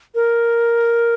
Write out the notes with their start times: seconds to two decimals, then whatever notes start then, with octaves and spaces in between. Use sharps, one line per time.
0.15 A#4